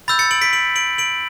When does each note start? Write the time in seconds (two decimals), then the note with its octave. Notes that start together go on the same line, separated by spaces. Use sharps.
0.08 B5 E6 G6 A6
0.19 A6 C#7
0.31 D7 F#7
0.42 B6 D7
0.53 D7 F#7
0.76 D7 F#7
0.98 D7 F#7